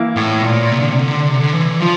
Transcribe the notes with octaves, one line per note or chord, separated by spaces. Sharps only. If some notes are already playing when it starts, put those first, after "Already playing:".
Already playing: E3 A#3 E4
A2
A#2
C3
D3
C3
D3
C3
D3
E3
F3